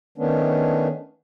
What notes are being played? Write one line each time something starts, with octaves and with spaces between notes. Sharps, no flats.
D#3 A3 B3 C#4 D4